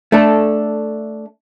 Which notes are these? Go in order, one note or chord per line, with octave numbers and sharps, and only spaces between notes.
A3 D4 A4